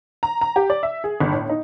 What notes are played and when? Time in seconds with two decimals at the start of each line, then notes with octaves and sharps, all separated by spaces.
0.23 A#5
0.41 A#5
0.56 G4
0.70 D5
0.83 E5
1.04 G#4
1.20 G1
1.32 A2
1.50 D#4